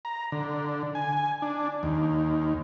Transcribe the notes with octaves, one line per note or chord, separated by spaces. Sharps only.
A#5
D3
G#5
D4
D#2